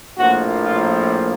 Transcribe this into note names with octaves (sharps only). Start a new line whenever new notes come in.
A#1 A2 F3 A#3 F#4
F4